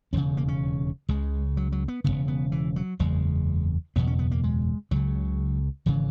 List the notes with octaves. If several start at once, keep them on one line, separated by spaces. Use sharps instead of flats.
E1 D#2 C#3 C#4
A#3
C#4
C#2 C#3 G#3
F#3
F#3
B3
E1 D#2 C#3 B3
B3
E3
F#3
F#1 E2 C#3 G#3
F#1 E2 B2 B3
C#4
B3
A#3
G#3
C#2 C#3 F#3
G#1 C#3 E3